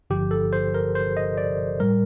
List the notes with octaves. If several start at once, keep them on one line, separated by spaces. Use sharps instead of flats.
G1 G2 D3 F3 G4
A4
C5
A#4
C5
D#5
D5
A2 G3 A#4